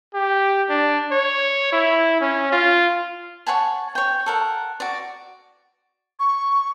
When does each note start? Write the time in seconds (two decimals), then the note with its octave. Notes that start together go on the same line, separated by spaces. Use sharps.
0.14 G4
0.70 D4
1.11 C#5
1.73 E4
2.21 C#4
2.52 F4
3.46 C#5 F#5 G#5 A5
3.95 C#5 G5
4.26 A4 A#4 F#5
4.80 F#4 D5
6.20 C#6